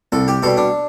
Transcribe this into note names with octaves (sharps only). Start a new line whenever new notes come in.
C2 A4
G4
B2 G3 A4
D4